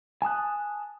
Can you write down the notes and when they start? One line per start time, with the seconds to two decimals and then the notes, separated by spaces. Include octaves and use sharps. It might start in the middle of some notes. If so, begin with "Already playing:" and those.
0.22 G#5 A5 D#6 F#6